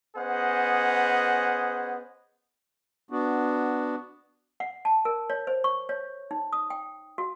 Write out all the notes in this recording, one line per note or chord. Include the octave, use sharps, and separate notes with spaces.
B3 C#4 G#4 C5 D#5 F#5
B3 D4 F#4
F#5
A5
A#4
C#5
C5
C#6
C#5
D#4
D#6
G5
F#4